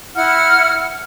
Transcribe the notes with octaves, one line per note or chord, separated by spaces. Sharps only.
E4 F#5 F6